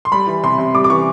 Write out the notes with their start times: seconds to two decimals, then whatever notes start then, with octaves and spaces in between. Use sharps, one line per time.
0.05 C6
0.12 G3 B5
0.27 E3
0.43 C3 C6
0.58 C3
0.74 G3 D6
0.84 D6
0.90 E3 C#6